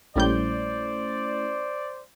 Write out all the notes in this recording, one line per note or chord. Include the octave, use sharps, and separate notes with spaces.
A#1 G3 A3 C#4 E4 C5 D5 G6